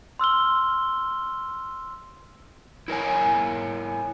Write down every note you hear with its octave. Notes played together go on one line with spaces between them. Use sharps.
C6 E6 F6 G7
E4 A#4 C#5 G#5